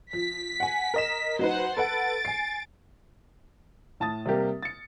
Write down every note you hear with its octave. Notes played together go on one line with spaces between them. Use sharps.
F3 B6
F#5 G#5
A#4 D#5 E7
F#3 D#4 B4 C5 F#5
A4 B4 F#5 A6 D7
G#5 C7
A2 A5 D#6 A6
C3 G3 A#3 G4 A#4
A6 C#7